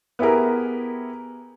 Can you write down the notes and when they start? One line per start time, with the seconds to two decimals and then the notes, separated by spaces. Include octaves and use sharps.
0.19 B3 E4 G4 G#4 A#4